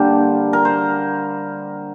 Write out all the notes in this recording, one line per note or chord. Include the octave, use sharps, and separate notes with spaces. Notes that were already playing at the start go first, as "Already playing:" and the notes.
Already playing: D3 G3 A#3 A#4 C5 D5
A#4
C5